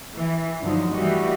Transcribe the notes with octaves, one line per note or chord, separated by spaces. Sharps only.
E3
G2 D3 F3 F#3 D#4
E3 G3 A3 F#4 G4 D#5